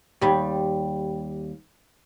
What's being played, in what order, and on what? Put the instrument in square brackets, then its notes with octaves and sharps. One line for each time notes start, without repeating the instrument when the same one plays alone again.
[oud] D#2 G3